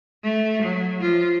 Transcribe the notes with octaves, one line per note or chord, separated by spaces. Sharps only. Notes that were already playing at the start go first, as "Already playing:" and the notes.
A3
F#3
F3 F4